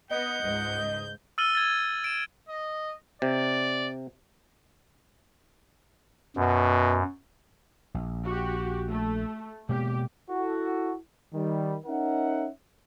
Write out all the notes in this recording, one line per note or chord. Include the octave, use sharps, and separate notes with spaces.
B3 D#5 F#5 G6
C#2 G#2
E6 F6 A6 D#7 F#7 G7
G#6 A6
D7 E7
D#5
C3 D5
F#2 B2
A#1
F#4 G4
A3
B2 G#3 A#3 G4
E4 F#4 A4
D#3 G3
C#4 D#4 A#4 E5 F#5